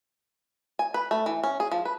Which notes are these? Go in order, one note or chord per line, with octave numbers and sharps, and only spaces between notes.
G#5
B4
A3
E3
C#4
G#4
F3
B4